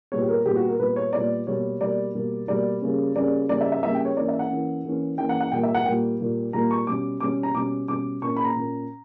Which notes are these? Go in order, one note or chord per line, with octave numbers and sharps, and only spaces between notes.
A#2 G3 B3 C#5
G4
A#4
A#2 G3 B3 G4
F#4
A#4
A#2 G3 B3 B4
C#5
A#2 G3 B3 D5
B2 G3 A#3 C#5
B2 G3 A#3 D5
B2 G3 A#3
B2 G3 A#3 D5
C#3 G3 A#3 C#4
C#3 G3 A#3 C#4 D5
C#3 G3 A#3 C#4 D5
E5
E5
C#3 G3 A#3 C#4 E5
G5
C#5
E3 A#3 C#4 D5
E5
F#5
E3 A#3 C#4
E3 A#3 C#4
E3 A#3 C#4 G5
F#5
F#5
A#2 G3 A#3 G5
E5
F#5
A#2 G3 A#3 G5
A#2 G3 A#3
A#2 G3 A#3 A#5
C#6
B2 G3 C#4 D6
B2 G3 C#4 D6
A#5
B2 G3 C#4 D6
B2 G3 C#4 D6
A#2 A#3 C#4 C#6
B5
A#5
A#2 A#3 C#4